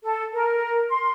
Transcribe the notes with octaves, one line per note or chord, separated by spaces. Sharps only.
A4
A#4
C6